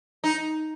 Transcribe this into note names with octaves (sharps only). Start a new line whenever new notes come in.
D#4